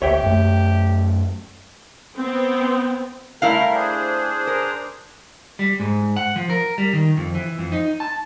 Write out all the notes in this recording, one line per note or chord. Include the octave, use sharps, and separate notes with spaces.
D2 G4 C#5 E5 G5
F#2 A3
B3 C4
G3 A3 E4 A#4 F5
D4 G#4 C5
A#4
G3
G#2
F#5
F3
A#4
G3
D#3
F2
E3
F2
D#4
A5